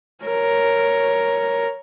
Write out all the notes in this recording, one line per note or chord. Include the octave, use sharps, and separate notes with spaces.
A#4 C#5